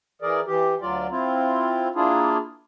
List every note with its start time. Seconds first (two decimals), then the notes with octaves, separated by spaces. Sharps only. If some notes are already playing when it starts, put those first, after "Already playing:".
0.22 E3 G#4 A#4 D5
0.47 E3 G4
0.82 D2 F#3 F4 D5
1.11 C4 E4 F4
1.96 A#3 D4 E4 F4 G#4